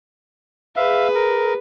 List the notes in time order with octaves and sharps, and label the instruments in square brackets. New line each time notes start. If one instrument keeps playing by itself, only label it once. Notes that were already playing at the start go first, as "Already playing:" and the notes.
[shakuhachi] G#4 [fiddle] B4 [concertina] E5 F5
[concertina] A#4